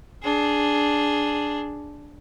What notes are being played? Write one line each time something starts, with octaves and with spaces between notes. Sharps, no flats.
D4 G#4